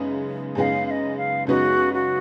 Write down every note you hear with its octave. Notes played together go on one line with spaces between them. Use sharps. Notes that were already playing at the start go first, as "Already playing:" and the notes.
Already playing: F#2 C#3 G#3 B3 D#4
F#2 C#3 G#3 B3 D#4 F5 G#5
F5
D#5
F5
F#2 C#3 G#3 B3 D#4 F#4
F#4